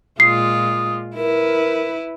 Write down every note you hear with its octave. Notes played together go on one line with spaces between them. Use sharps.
A#2 G#3 F4 D#6 C7
E4 A#4 B4